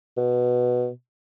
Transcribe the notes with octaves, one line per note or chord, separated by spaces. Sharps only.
B2